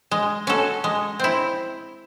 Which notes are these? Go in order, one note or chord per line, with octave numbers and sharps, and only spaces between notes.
G#3
C#4 F#4 A4
G#3
C4 E4